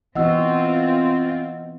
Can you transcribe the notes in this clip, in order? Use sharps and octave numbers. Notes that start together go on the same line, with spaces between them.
E3 B3 C4 F4 F#4 D#5 F#5 E6